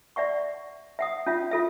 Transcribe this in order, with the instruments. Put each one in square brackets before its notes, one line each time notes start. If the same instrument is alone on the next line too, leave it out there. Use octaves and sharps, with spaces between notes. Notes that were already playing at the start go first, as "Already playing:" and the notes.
[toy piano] D5 E5 F#5 C#6
E5 F#5 D#6
C#4 F4 E5
F4 A4 E5